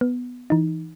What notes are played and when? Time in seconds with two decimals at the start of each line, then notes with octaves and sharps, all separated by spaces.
0.01 B3
0.50 E3 D#4